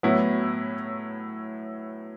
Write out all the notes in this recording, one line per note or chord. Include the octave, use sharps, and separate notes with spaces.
A2 F#3 B3 E4